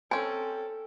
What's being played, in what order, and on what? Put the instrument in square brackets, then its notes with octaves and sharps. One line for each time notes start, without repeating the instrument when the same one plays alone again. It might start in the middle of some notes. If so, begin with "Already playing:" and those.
[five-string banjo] C4 C#4 [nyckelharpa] A4 [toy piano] G#5